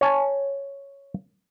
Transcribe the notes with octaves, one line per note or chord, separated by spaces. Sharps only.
C#5 G#5 A5